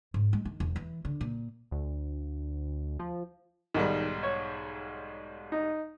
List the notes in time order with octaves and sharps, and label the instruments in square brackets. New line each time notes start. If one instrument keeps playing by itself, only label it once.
[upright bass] G#2
G#3
D#3
E1
E3
D3
A#2
[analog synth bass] D2
F3
[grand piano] B1 G#2 G3 [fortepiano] D#3
[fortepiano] C#5
D#4